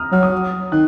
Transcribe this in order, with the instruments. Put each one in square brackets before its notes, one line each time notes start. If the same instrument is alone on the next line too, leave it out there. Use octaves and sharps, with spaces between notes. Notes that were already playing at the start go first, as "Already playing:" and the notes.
Already playing: [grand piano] A#5 D#6 F6
[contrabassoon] F#3 [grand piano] F6
[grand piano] D#6
[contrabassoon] D#3 [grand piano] F#6